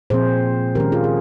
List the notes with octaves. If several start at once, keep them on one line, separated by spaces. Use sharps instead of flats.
A#2 F3 C4 G#4 C5
D#3 G#3 C#4 G4 A#4
F4 G#4
G#4